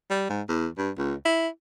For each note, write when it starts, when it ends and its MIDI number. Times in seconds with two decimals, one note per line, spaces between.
0.10 0.25 55
0.30 0.42 44
0.49 0.67 40
0.77 0.90 43
0.98 1.15 37
1.25 1.48 64